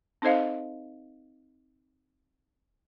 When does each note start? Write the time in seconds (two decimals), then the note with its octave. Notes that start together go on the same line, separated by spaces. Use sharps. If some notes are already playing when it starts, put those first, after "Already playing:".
0.22 C4 D#4 A4 C5 D#5 F5